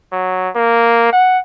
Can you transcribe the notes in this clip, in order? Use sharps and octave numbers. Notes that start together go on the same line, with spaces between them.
F#3
A#3
F#5